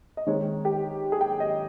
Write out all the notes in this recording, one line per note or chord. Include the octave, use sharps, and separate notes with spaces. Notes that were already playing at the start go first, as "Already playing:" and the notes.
D#5
D#3 G#3 C4 C#5
G4
G#4
G5
D#5